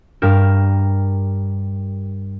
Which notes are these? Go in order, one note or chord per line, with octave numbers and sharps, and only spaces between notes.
G2 G4 A#4 F6 E7